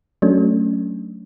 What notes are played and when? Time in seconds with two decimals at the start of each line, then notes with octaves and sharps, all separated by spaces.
0.22 F#3 A3 C#4 D4